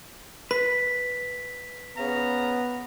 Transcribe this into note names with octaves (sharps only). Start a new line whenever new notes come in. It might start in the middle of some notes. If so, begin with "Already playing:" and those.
B4 B6
C#3 B3 F5 A#5